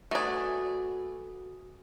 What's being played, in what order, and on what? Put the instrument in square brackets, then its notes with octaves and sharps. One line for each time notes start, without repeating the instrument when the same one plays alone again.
[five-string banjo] A3 D5 [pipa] B3 G#4 [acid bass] F#4